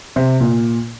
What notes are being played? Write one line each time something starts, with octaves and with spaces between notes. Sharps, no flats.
C3
A#2